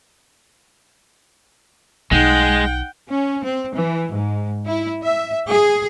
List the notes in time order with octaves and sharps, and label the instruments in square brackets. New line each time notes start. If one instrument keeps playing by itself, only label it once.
[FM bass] B1 [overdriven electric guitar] G#3 [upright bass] D#4 [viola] F#5 G5
[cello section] C#4
C4
E3
G#2
E4
E5
G#4